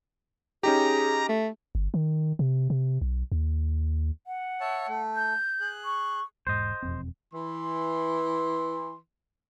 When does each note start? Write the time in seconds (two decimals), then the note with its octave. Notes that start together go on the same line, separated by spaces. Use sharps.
0.63 C#4 D#4 G4 G#4 A#5
1.29 A3
1.75 G1
1.94 D#3
2.39 C3
2.70 C3
3.02 B1
3.32 D#2
4.27 F#5
4.61 C#5 E5 A5
4.88 A3
5.16 G6
5.61 G#4 F#6
5.85 C#6
6.47 E1 G#2 C5 D#5
6.83 E1 F2 C4
7.34 E3 C6